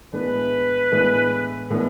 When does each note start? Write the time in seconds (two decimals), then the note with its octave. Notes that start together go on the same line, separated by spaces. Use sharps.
0.13 A2 E3 G#3 B3 D4 B4
0.92 A2 E3 G#3 B3 D4
1.70 A2 E3 G#3 B3 D4